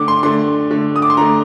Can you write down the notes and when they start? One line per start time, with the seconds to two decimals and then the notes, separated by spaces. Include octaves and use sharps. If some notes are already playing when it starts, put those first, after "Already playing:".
Already playing: D3 A3 D6
0.08 C6
0.23 D3 A3 C6
0.71 D3 A3
0.96 D#6
1.02 D6
1.10 C6
1.17 D3 A3 A#5